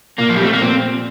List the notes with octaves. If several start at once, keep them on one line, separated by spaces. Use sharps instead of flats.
A#2 A#3
F3
G3
F3 A3 C4
A#3
A#2 C4